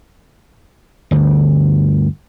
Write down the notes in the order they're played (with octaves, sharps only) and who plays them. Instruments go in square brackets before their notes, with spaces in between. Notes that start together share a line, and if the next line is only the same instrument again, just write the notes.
[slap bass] G1 D2